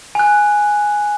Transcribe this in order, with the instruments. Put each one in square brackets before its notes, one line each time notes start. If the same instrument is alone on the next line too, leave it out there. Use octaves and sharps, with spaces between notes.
[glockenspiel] G#5 F#6